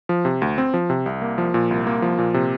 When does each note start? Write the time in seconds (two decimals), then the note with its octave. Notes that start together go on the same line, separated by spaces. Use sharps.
0.09 F3
0.25 C3
0.42 D2
0.58 C4
0.74 F3
0.90 C3
1.06 C2
1.22 A#3
1.38 F3
1.54 A#2
1.71 C2
1.87 A#3
2.02 F3
2.18 A#2
2.34 C3